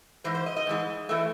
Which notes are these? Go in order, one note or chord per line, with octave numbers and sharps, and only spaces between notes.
G#2 E3 C5
C5
D#5
D#5
G#2 E3 G#3
E3 A3